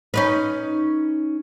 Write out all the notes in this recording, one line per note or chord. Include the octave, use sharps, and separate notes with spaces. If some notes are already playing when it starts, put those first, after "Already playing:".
C#4 D#4 B4